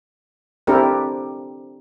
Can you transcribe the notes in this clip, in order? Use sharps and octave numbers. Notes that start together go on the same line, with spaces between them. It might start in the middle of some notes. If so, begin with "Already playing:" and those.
C4 D4 E4 G4 A4 A#4